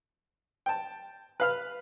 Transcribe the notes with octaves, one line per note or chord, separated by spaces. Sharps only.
G5 A5
B4 F5 F6